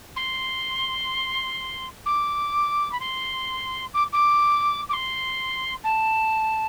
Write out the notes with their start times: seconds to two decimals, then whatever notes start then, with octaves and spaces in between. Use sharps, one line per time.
0.16 C6
2.06 D6
2.91 B5
3.00 C6
3.94 D6
4.12 D6
4.89 D6
4.93 C6
5.84 A5